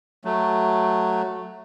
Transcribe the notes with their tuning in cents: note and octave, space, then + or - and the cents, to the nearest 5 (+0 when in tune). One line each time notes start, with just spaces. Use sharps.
F#3 +0 A3 +0